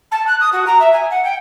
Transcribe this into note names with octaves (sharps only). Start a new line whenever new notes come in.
A5
F#6
D#6
F#4
A#5
E5
G#5
F#5
G5